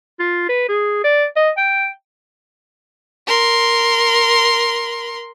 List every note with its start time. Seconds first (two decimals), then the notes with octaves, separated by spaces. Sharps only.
0.19 F4
0.49 B4
0.69 G#4
1.04 D5
1.36 D#5
1.57 G5
3.27 A#4 C6